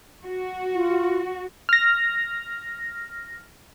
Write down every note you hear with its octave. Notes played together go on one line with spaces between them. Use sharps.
F#4
F4
F6 A#6